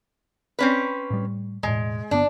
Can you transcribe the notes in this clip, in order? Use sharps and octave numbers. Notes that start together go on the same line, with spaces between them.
C4 C#4 B4
A2 G3
E1 A2 G#3
G1 B3 D4